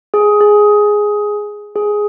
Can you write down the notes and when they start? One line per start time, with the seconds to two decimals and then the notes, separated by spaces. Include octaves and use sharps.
0.14 G#4
0.41 G#4
1.76 G#4